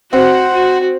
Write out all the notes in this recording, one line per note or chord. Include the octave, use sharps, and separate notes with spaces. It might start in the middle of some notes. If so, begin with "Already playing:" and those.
C4 F#4 C5 F#5
F#4